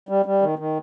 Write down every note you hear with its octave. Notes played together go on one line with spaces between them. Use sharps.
G3
G3
D#3
D#3